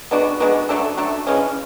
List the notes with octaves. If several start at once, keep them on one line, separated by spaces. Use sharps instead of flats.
G#3 B3 D4 F#4
G#3 B3 D4 F#4
F#3 A3 D4 A4
F#3 A3 D4 A4
C#3 E3 G#3 C#4